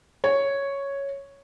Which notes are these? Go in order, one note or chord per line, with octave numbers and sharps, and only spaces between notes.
C#5